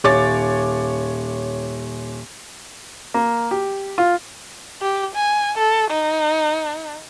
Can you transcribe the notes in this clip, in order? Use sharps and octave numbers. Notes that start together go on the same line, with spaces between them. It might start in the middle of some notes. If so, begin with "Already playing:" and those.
D#1 C#5 D6 A6
A#3
G4
F4
G4
G#5
A4
D#4